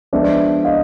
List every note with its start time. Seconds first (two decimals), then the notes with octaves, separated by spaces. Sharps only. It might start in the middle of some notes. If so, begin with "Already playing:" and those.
0.13 F3 G#3 B3 D4 D5 E5
0.65 D#5 F5